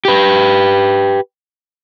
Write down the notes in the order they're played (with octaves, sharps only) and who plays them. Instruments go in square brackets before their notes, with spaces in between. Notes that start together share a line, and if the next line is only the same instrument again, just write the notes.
[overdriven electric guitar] G4 B4